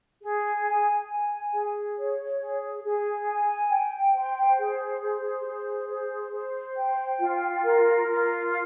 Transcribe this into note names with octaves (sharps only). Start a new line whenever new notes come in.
G#4
G#5
G#5
G#4
C#5
G#4
G#4
G#5
G5
C5
G#4
C5
G#4
C5
C5
G5
F4
A#4
F4